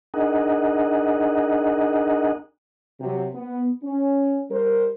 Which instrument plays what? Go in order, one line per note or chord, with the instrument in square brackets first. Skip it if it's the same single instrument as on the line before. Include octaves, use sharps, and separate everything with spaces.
[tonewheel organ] D4 D#4 G#4 A#4 D#5 F#5
[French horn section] C3 F#3
B3
C#4
G3 A#4 C5